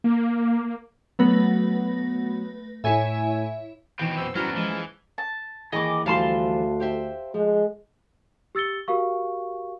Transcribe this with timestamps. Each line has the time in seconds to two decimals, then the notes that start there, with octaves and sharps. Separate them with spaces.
0.04 A#3
1.19 F#3 A3 B3 B4 A#6
2.84 A2 E4 C#5 E5 G#5
3.99 B2 D#3 E3 C4 C#5 G5
4.18 F#2 B4 C5 E6
4.35 E2 F#3 G3 C#4 D4 E4 F#4 A#5
4.55 E3 F3 G#3
5.18 A5
5.72 D#2 E3 G#4 D#5 D6
6.06 D2 E3 F3 G3 F5 A5 C6
6.80 G4 C5 E5
7.34 F3 G#3
8.55 G4 E6 A6 C#7 G7
8.88 F#4 G4 A#4 F5 C#6